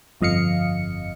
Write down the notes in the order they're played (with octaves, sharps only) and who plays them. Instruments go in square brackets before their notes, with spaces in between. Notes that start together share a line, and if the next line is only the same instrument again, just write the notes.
[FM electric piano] G1 F2 D#5 F5 C#7